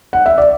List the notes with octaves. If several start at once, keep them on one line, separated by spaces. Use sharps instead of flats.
F#5
E5
D5